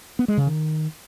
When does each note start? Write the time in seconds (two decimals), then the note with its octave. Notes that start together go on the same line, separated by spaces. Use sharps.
0.19 B3
0.28 G#3
0.37 C#3
0.47 D#3